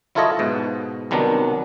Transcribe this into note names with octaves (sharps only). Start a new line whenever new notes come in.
F#3 E4 F4 A4 C#5 D#5
G#2 B2
C2 D#3 F#3 B3 D4